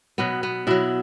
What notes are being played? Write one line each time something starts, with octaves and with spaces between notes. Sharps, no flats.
B2 F#3 B3
B3
B2 F#3 E4